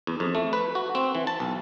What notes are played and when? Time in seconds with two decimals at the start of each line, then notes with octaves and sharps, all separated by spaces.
0.07 E2
0.20 F2
0.35 A3
0.53 B4
0.75 F#4
0.95 C4
1.15 E3
1.27 A5
1.40 B1